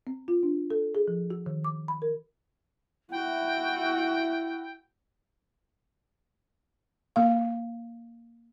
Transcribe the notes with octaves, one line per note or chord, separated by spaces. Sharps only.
C4
F4
D4
A4
G#4
F3
F#4
D#3
D6
B5
A#4
E4 F#4 G5
A#3 F5